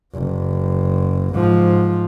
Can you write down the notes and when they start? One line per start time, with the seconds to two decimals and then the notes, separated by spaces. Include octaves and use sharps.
0.14 F#1
1.34 G#2 F3